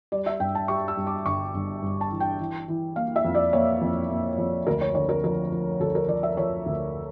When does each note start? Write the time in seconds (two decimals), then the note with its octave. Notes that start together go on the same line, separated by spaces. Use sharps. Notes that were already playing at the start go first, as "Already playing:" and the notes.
0.12 G3 D5
0.26 E5
0.40 G2 G5
0.55 A5
0.68 G3 C#6
0.88 E6
0.97 G2
1.07 D6
1.25 G1 C#6
1.54 G1
1.82 G2
2.01 A5
2.11 E3
2.20 G5
2.39 E3
2.68 E3
2.96 A#3 F5
3.16 E5
3.24 F2
3.35 D5
3.53 A#3 C#5
3.81 F2
4.10 A#3
4.38 F2
4.67 D2 A#4
4.81 C#5
4.95 D3 C#5
5.09 A#4
5.24 F3 A#4
5.52 F3
5.80 D2 A4
5.95 A#4
6.08 F3 D5
6.23 E5
6.37 F3 C#5
6.66 D2